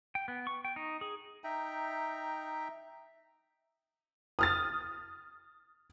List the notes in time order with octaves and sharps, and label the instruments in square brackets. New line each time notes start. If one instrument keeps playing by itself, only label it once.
[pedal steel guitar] G5
B3
C#6
G5
D#4
G#4
[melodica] D#4 E5 G5 A#5
[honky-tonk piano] D#6 F6 A6